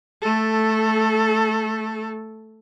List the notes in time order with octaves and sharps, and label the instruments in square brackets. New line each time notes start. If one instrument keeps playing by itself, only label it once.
[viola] A3 A4